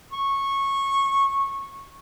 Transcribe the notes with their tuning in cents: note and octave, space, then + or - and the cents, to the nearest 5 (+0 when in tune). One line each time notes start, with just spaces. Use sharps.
C#6 -15